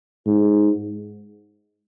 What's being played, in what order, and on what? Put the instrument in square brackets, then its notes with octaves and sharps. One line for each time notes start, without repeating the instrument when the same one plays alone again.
[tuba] G#2